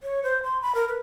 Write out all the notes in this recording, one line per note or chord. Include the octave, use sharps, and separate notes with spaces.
C#5
C5
C6
B5
A#4
B4